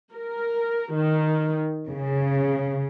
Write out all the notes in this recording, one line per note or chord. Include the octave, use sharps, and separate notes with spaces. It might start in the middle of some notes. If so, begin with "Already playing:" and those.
A#4
D#3
C#3